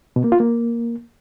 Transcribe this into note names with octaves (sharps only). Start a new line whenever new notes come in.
B2
A#3
F4
A#3